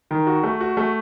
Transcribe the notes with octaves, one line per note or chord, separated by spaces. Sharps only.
D#3
F#4
A3
F#4
A3